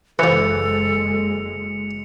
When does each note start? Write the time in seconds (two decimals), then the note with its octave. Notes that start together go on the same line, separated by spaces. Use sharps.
0.19 F#1 E3 F3 G#3 A4 C#7 F7